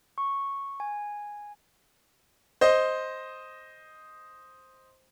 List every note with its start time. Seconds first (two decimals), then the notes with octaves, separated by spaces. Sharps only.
0.18 C#6
0.80 G#5
2.61 C5 D#5